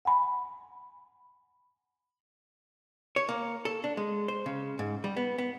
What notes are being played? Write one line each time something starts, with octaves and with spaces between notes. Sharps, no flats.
F#5 G#5 B5
C#5
A#3
A4
D4
G#3
C5
C#3
G#2
G3
B3
B3